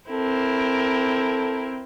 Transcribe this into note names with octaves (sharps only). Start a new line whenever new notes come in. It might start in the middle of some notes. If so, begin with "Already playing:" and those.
C4 E4 A4 A#4